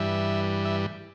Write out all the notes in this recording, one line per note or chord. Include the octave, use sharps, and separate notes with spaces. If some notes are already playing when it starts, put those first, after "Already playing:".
Already playing: G2 E3 G3 E5
E5